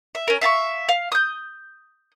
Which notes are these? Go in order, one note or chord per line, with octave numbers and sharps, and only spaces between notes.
E5
C#4 A#4
E5 F5 A5 C#6
F5
D#6 G6